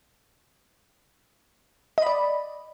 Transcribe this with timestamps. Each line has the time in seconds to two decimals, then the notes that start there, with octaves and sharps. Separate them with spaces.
1.98 D#5
2.02 B5
2.07 D5